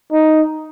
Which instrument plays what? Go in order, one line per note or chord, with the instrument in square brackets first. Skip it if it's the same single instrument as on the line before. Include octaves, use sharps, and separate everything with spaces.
[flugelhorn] D#4